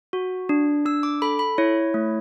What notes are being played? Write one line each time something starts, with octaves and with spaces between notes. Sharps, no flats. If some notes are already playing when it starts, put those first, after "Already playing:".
F#4
D4
D4 E6
D6
A4 B5
B5
E4 C#5
A3